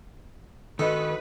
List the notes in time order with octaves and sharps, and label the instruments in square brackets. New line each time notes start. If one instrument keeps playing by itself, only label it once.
[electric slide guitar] D#3 D#4 F#4 [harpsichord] A4 [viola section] B4 [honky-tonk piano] D#5